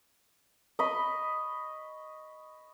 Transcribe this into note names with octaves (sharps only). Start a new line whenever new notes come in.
D#5 B5 C#6